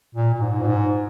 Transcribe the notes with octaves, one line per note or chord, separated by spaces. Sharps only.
A#2
A#2
G#2
A#2
G#2